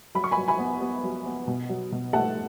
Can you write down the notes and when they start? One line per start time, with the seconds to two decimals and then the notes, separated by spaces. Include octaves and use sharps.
0.15 F#3 B5
0.24 C#6
0.31 G#5 B5
0.37 F#3
0.48 G#5 B5
0.59 B3
0.81 B3
1.03 F#3
1.26 B3
1.48 B2
1.69 F#3
1.92 B2
2.13 A3 F#5 A5